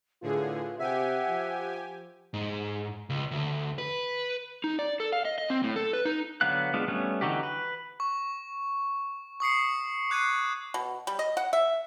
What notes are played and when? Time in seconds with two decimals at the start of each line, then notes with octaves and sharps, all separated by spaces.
0.22 A2 D3 F4 G#4 B4
0.79 C3 G4 E5 F#5 G#5
1.29 F3
2.34 G#2
3.10 C#2
3.31 D2
3.78 B4
4.64 D#4
4.79 D5
5.00 A4
5.12 F5
5.25 D#5
5.38 D#5
5.50 C4
5.64 A2
5.76 A4
5.93 B4
6.05 D#4
6.41 D3 F#3 B3 F5 F#6
6.73 G#3 B3 D4 F4
6.88 G3 A3 B3 C#4
7.21 D3 E3 D#4 F#4 G4
7.43 B4
8.00 C#6
9.40 C#6 D#6 C7 C#7
10.10 D6 F#6 G#6 C7 D#7
10.74 B2
11.07 G3
11.19 D#5
11.37 F#5
11.53 E5